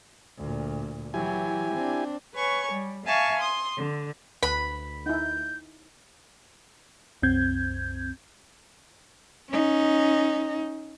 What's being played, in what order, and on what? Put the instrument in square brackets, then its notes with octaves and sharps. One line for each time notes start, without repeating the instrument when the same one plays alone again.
[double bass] D2 A#2
[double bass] E3 F#3 [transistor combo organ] E4 G4 G#5
[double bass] C4 D4
[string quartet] B4 C#5 G#5 C#6
G3
E5 F5 G#5 A5 C#6
C6 D#6
D3
[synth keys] D2 [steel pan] B4 [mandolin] B5
[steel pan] D#4 E4 [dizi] G6
[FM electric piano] C2 F#2 C4 G6 G#6
[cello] C#4 D#4